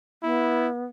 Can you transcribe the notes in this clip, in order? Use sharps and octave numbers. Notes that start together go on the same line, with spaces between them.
B3 E4